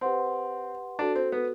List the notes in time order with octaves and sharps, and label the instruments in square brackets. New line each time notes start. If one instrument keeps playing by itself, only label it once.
[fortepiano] C4 [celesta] G4 B4 F#5 C6
[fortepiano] D4 [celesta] F#4 A4 C5
[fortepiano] C4
B3